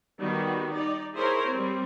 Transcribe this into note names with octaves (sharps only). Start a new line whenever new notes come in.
D#3 G3 B3 F#4
D#4 D5
E4 G#4 A#4 C5 C#5
G3 C4